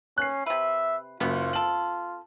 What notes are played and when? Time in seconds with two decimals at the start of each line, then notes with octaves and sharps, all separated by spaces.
0.18 C#4 F#6 C7
0.46 C3 B4 E5
1.20 F#1 F#2 B3 F4
1.53 C4 A4 F#7